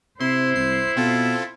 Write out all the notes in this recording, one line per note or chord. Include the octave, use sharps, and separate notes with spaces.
C3 E4 C5 C6
C2 C7
B2 C4 F4 A4